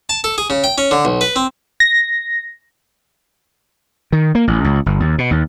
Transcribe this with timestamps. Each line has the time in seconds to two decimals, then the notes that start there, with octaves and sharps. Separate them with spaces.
0.09 A5
0.24 A4
0.38 G#4
0.50 C#3
0.64 G5
0.78 C#4
0.91 D3
1.05 B1
1.21 B4
1.36 C4
1.80 A#6
4.12 D#3
4.35 A#3
4.47 A1
4.64 C#2
4.86 G1
5.00 D#2
5.18 B2
5.31 D#2